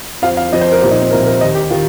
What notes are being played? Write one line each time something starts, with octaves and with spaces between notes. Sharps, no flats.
F2 F3 F5
F5
F2 F3 D#5
C5
A#4
C2 A#2 F3 G4
D#4
C4
C2 A#2 F3 A#4
A#4
D#2 D#3 D#5
G4
D#3 F4